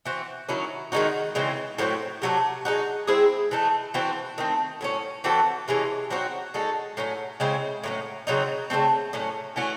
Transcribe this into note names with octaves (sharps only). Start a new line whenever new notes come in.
E3 C4 F#4
D#3 F#3 C#4 E4
D#3 G#3 D#4 F#4
C#3 E3 G#3 C4
A2 F#3 C4 F#4
C3 F#3 A3
G#3 D#4 F#4
G#3 C4 E4 G#4
E3 A3 D#4
E3 C4 F#4
D#3 A3 C4
A2 F#3 C#4
E3 C4 F#4 A4
C3 E3 G#3 C#4
F#3 C4 D#4 F#4
G#3 D#4 F#4 A4
A2 F#3 C#4
C#3 G#3 C4 E4
A2 F#3 C#4
C#3 F#3 C4 D#4
C#3 F#3 A3 C4
A2 F#3 C#4
E3 A3 C#4 F#4